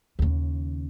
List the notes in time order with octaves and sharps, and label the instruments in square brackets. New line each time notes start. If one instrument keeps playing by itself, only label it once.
[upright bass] D#2 C#3